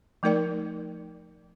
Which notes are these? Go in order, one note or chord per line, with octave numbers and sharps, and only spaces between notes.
F3 A3 D#4 A#4 D5 G5